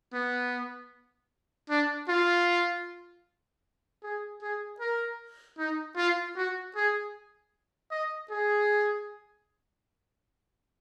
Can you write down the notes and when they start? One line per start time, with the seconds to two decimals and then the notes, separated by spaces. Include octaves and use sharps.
0.13 B3
1.70 D4
2.08 F4
4.03 G#4
4.42 G#4
4.80 A#4
5.58 D#4
5.97 F4
6.36 F#4
6.76 G#4
7.91 D#5
8.30 G#4